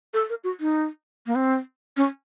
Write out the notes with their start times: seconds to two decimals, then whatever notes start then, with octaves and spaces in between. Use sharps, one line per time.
0.14 A4
0.30 A#4
0.44 F#4
0.60 D#4
1.26 A#3
1.35 C4
1.97 C#4